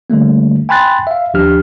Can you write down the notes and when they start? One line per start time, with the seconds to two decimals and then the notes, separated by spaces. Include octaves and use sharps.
0.10 D3 G3 A3 A#3
0.69 G5 G#5 B5 C6 F#6 A6
1.07 E5 F5
1.34 D#2 F3 D4 G4 F6